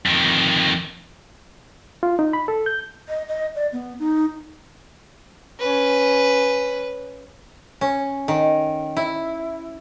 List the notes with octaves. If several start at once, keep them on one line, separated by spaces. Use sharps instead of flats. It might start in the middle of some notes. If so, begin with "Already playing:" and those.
F2 D#3
F4
D#4
B5
A4
G6
D#5
D#5
D5
B3
D#4
C#4 B4
C#4
D#3
E4